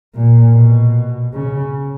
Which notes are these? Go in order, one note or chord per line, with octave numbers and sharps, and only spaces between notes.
A#2
B2
C#3